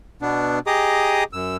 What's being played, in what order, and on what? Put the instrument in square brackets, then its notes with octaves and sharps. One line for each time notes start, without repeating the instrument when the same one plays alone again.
[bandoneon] B2 B3 D4
G4 G#4 D#5 A#5 D6 D#6
F#2 E6